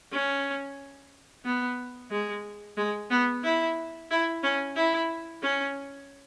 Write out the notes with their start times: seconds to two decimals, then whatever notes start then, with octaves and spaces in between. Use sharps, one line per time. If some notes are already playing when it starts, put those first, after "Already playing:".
0.13 C#4
1.45 B3
2.11 G#3
2.78 G#3
3.10 B3
3.44 E4
4.11 E4
4.43 C#4
4.77 E4
5.43 C#4